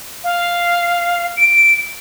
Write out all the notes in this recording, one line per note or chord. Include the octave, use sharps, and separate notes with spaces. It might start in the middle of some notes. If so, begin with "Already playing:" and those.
F5
D7